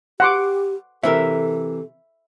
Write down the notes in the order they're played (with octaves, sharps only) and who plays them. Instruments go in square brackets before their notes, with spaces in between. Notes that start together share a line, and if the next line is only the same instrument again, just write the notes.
[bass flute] G4 [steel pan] F#5 C6 D6
[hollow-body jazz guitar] C3 E3 A#4 [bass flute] A4 [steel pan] E5